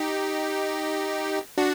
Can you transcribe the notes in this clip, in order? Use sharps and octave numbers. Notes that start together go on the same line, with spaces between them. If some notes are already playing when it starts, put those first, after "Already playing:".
Already playing: D#4 G4
D4 F#4